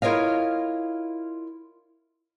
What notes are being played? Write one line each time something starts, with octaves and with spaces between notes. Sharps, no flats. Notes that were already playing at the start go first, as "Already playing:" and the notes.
E4 F4 A#4 C#5 D#5 F5